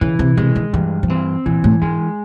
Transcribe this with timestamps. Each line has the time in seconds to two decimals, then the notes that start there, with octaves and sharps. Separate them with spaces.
0.01 C#3 E3
0.19 C3
0.37 C3 G#3
0.56 D#3
0.73 G2 E3
1.03 F3
1.09 E3 C4
1.46 A#2 E3
1.64 A2
1.82 G#2 G#3